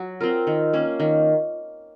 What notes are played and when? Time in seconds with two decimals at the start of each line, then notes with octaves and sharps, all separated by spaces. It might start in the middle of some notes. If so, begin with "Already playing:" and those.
Already playing: F#3
0.21 C4 F4 A#4
0.47 D#3
0.73 A#3 C#4
1.00 D#3